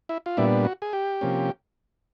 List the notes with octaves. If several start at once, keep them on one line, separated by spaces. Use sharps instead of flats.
E4
F4
A#2 G3 B3 D4 E4
F#4
G#4
G4
C3 F3 A#3 C#4